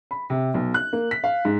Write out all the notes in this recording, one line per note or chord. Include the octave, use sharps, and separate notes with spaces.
B5
C3
B1
F#6
A#3
B6
F5
G#2